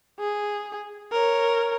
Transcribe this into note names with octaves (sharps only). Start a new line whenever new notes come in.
G#4
A#4 C#5